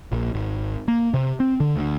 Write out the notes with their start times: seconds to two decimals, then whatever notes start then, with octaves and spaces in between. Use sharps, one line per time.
0.12 A#1
0.34 G#1
0.88 A#3
1.14 C3
1.40 C4
1.60 D3
1.75 D2